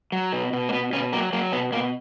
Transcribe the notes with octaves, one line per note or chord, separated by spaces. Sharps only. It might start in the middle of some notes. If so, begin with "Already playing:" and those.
F#3
B2
B2
A#3
B2 B3
B2 C#4
F#3 A#3
F#3 A#3
B2 B3
B2 A#3